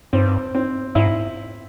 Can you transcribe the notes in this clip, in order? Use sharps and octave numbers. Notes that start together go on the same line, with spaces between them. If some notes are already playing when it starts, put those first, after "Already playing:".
G2 C4
C4
G#2 E4